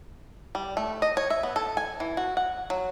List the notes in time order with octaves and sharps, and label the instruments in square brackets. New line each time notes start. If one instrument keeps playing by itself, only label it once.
[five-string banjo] G3
A3
D#5
C#5
E5
B3
A4
G#5
E3
F#4
F#5
F#3